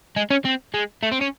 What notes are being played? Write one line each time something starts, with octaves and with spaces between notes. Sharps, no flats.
G#3
C#4
C4
G#3
A3
C4
C#4